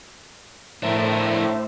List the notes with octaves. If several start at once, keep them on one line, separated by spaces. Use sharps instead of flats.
A2 A3 D4 A#4 C5 E5